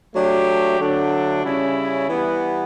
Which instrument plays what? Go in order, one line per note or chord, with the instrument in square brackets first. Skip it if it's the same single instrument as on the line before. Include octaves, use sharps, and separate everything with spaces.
[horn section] F#3 A3 D4 G4
D3 F#3 A3 D4
C#3 G3 C#4 E4
E3 G3 B3